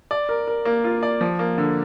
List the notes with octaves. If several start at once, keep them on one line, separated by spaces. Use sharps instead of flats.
D5
A#4
A#4
A#3
F4
D5
F3
A#3
D3